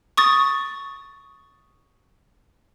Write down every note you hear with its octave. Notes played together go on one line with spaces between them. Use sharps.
C#6 D#6 A6